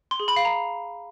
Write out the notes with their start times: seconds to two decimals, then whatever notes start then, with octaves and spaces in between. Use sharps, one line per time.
0.11 C6
0.20 G#4
0.28 B5
0.36 F5
0.45 A#5